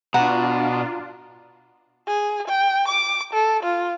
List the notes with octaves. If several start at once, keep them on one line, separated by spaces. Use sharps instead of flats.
B2 D4 F4 F#5 A#5
G#4
G5
D6
A4
F4